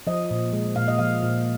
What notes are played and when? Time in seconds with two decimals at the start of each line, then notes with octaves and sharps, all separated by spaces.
0.07 F3 D#5
0.31 A#2
0.53 G#3
0.76 A#2 F5
0.88 D#5
0.99 F3 F5
1.23 A#2